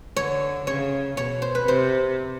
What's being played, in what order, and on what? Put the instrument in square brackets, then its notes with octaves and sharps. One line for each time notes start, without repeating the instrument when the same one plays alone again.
[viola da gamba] D3 [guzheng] C#5
[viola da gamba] C#3 [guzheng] C#5
[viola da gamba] B2 [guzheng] C#5
[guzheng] C5
B4
[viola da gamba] C3 [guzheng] C5